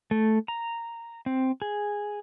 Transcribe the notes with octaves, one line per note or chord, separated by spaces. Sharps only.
A3
A#5
C4
G#4